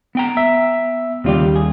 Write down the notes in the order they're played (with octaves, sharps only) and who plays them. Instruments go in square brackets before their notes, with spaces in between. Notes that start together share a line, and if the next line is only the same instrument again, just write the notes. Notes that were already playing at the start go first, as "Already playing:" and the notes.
[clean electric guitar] B3 G5 A#5
[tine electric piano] E5
[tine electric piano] D#2 G3 [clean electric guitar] C#3 F4 G4
[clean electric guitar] G#4